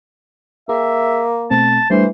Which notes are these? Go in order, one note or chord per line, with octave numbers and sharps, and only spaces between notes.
A#3 G#4 E5
B2 A3 C4 A5
E3 G3 A3 D4 C5